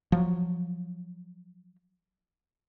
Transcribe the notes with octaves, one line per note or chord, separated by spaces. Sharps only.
F3 F#3